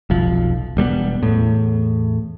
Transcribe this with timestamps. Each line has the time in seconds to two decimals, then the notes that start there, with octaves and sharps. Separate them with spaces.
0.10 F1 B1 F3
0.77 E1 G3 A3 B3
1.23 E2 A2